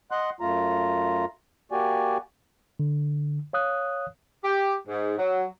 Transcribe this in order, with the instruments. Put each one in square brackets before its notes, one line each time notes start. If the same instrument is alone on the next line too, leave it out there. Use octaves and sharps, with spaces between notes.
[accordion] D#5 F#5 C6 F#6
F#2 A3 F4 A#5
A#3 F#4 G4 D5 G#5
[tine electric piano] D3
C#5 F5 D#6 F#6
[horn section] G4
G#2
F#3